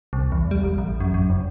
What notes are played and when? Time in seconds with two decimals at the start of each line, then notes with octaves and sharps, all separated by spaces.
0.13 C2
0.32 E2
0.51 G3
0.63 A1
0.78 A1
1.00 F#2
1.14 F#2
1.30 F1